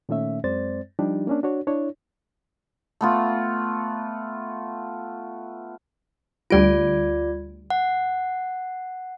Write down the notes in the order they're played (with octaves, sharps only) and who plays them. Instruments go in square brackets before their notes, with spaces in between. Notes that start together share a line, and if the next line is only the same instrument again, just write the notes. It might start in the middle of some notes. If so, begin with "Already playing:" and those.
[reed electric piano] A#2 D#3 A3 C#4 E5
F#2 G#3 C4 C5 D5 A6
F3 G3 D4 D#4 G4
A#3 C#4 D4
D4 F#4 C#5
D4 E4 C#5
[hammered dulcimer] A3 B3 F4
[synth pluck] D2 G3 D7 [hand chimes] F4 D5
[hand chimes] F#5